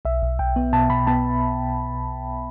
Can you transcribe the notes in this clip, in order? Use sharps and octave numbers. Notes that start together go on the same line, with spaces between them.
B1 E5
B1
B1 G5
B3
B2 A5
B2 B5
B3 A5